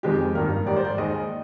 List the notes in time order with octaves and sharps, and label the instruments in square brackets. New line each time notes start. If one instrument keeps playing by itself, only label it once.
[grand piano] F2 D#3 G#3 C4 G4
G2 D#3 A#3 A#4
G#2 D#3 G3 D5
C5
D5
D#2 D#3 G#3 D#5